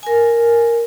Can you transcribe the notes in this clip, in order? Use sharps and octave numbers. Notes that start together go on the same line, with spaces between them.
A#4 G#5